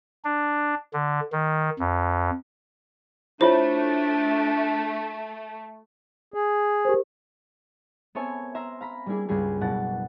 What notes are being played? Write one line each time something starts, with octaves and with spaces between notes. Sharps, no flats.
D4
D3
D#3
F2
A3 D4 E4 F4 C5 C#5
G#4
G4 A#4 C5
B3 C4 A4 C#5 E5 G#5
E5 A#5 C6 F6
F5 A#5 B5
G3 A#3 D4 E4 G#4
C#2 G2 G3 G#4
F#1 B2 F#5 A6